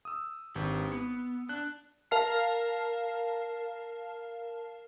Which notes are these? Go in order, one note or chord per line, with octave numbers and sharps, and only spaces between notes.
D#6 E6
G#1 G4 B4
B3 C#7
D4 F#6
A#4 F5 A5 F6 C7